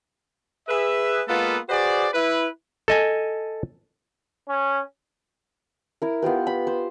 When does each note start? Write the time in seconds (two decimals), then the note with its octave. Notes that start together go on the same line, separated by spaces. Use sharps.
0.68 G#4 B4 E5
1.28 G#3 A#3 B3 F4 A4 B4
1.69 F#4 G#4 B4 C5 D5
2.14 E4 B4
2.88 A4 D#5 G#5
4.49 C#4
6.02 E4 A#4
6.22 B3 F4 G4 B4
6.47 B5
6.67 C5